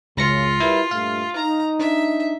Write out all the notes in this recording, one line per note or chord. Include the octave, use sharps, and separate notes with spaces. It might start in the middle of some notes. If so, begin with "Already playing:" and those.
C#2 F#2 C#3 F4 A#6 C#7
G3 E4 A#4 B4
G2 A#2 A3 F5
D#4 A#5
D4 E5